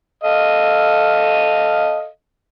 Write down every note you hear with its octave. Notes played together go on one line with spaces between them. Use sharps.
A4 D#5 F5